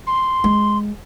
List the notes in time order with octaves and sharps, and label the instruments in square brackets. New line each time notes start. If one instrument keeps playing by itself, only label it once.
[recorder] C6
[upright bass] G#3